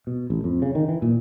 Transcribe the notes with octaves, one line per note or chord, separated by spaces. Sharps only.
B2
A1
F2
C#3
D#3
E3
A#2